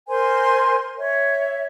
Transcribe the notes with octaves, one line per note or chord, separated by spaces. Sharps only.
A#4 C5 G#5 C6
C#5 E5